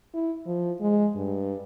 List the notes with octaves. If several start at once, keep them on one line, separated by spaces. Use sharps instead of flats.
E4
F3
G#3
G2